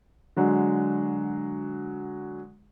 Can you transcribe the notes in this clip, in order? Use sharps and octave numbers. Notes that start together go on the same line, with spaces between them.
D3 F#3 G#3